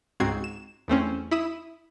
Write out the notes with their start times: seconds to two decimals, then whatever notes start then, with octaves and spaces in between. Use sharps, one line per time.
0.20 C#2 G#2 C4 F#4 G#6 C7
0.44 E7
0.88 E2 A3 C4 C#4
1.31 E4 B5 D#6 E7